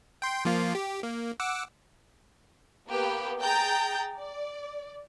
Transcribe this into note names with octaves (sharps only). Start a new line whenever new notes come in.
G5 C6
F3 A#3 F4
G4
A#3
F#5 D6 E6
A#3 B3 G4 B4
G#4 G5 A#5 G6 A6
D5